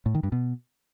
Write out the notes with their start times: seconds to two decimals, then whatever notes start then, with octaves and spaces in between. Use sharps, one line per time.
0.06 A2
0.15 D#3
0.23 G2
0.32 B2